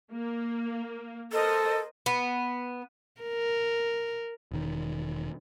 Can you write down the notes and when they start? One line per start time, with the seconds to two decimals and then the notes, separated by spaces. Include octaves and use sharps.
0.12 A#3
1.32 A4 A#4 C5 D#5
2.06 B3
3.22 A#4
4.52 E1 D#3